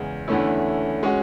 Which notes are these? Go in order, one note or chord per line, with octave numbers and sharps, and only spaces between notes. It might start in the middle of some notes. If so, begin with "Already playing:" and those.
Already playing: E2 C#3 G#3
E2 D3 A3 C#4 E4
G#3 C#4 F#4